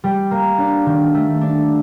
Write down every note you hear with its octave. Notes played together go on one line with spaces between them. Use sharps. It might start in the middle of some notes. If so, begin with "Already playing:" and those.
G3
A#3
D4
D#3
A3
D4